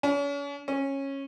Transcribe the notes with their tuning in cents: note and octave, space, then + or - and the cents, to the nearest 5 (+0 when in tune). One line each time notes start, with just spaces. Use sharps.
C#4 +40
C#4 -15